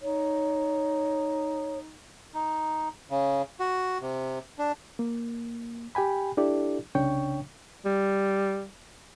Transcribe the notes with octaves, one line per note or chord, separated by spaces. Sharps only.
D#4 C#5
D#4
C#3
F#4
C3
D4
A#3
G4 G5 G#5 B5
D4 E4 G4 A4 D5
C2 C#3 D4 C#5 G5 C#6
G3